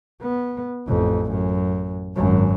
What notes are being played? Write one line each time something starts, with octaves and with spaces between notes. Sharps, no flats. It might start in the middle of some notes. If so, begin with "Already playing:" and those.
B3
A1 F2
F#2
G#1 F#2